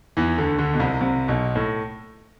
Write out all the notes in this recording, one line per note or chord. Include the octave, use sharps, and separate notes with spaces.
E2 E3
D2 D3
D2 D3
B2
C2 C3
C2 C3
B1 B2
A2